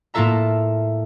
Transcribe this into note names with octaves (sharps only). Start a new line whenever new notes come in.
A2 A#3 F4 A4 E5 A#5